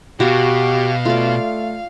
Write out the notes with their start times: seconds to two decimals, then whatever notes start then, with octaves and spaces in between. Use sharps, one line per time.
0.20 B2 F#4 G4 F5
1.05 A3 F4 D5